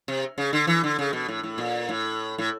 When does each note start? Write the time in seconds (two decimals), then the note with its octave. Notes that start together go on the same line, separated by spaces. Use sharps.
0.08 C3
0.38 C#3
0.53 D3
0.67 E3
0.84 D3
0.99 C#3
1.13 B2
1.28 A2
1.43 A2
1.58 A#2
1.89 A2
2.38 A2